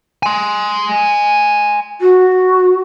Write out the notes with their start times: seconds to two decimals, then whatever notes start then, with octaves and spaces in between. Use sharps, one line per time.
0.23 G#5 C6
2.00 F#4